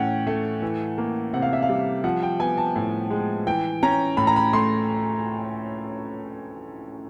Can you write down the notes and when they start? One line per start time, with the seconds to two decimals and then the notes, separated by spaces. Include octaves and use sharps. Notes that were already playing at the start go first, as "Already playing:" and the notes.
Already playing: A2 E3 C#4 F#5 G5
0.27 A3
0.62 E3
0.98 A#3
1.33 C3 F#5
1.42 F5
1.53 E5
1.62 F5
1.69 G3
2.04 F3 F#5
2.23 G5
2.40 B3 G#5
2.58 A5
2.76 A2
3.10 G#3
3.47 E3 G5
3.83 C#4 A#5
4.17 A2 B5
4.27 A#5
4.36 B5
4.53 A3 C6